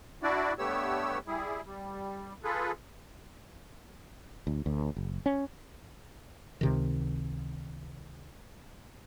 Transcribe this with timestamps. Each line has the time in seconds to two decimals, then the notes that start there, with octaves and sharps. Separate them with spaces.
0.23 D4 E4 F#4 D5
0.59 G2 A3 B3 G4 C#5 E6
1.27 G3 E4 G#4
1.65 G3
2.44 F4 G#4 A4 B4
4.47 D2
4.66 D2
4.97 F#1
5.26 C#4
6.61 C#2 C3 D#3